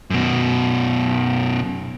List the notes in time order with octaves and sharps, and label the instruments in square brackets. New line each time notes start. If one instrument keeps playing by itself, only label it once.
[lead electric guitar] F#2 B2